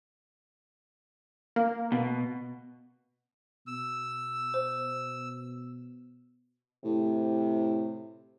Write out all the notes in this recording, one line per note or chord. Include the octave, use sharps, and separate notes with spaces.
A#3
B2
B2 E6
C5
A2 C3